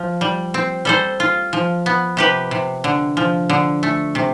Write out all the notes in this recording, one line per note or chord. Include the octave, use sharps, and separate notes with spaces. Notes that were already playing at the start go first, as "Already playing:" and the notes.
Already playing: F3
G3
C4
G3 A4 C5
F4
F3
B3
C3 G4 B4
C3
D3
F3
D3
A3
C3